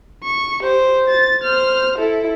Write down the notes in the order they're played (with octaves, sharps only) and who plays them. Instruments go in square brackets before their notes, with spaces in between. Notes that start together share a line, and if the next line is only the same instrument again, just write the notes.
[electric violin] C#6
[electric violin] G4 [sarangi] C5
[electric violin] A6
[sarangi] C5 [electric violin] F6
[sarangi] E4 [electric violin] A4